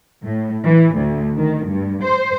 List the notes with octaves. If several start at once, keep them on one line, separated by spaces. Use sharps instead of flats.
A2
E3
D2
D#3
G2
C5